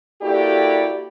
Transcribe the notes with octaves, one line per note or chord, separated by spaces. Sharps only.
A#3 E4 F#4 G4 A4 D5